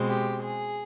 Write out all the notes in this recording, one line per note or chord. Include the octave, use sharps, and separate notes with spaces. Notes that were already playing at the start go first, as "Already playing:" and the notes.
Already playing: B2 G#3 C4
G4
G#4